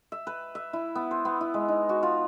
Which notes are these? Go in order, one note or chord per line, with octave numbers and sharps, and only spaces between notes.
E5
B4
E5
E4
B3
C5
B3
E4
G#3
D#4
F#4
F4